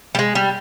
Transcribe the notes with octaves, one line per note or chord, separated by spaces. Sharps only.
G3
G#3
G3